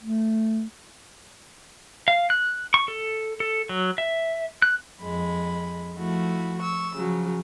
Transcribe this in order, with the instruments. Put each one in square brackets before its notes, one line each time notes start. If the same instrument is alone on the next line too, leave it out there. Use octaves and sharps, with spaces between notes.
[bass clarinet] A3
[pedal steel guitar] F5
F#6
C#6
A4
A4
F#3
E5
F#6
[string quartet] F2 G#3 B5
F3 A3 E4 F#4
C#6 E6
C#3 F3 F#3